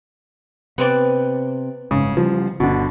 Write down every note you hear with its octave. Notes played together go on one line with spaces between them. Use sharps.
C3 B3 C4 D5
F#1 G#2 C#3
C#3 F3 G3
G1 B2 D3